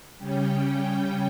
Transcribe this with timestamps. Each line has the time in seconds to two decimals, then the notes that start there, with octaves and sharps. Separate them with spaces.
0.18 C#3 G3 C#4 G5